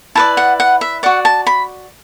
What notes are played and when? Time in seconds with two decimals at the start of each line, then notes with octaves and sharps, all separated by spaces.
0.15 E4 B4 D5 A5
0.37 F#5
0.60 F#5
0.81 E5
1.03 F#4 D5 F#5
1.25 A5
1.47 B5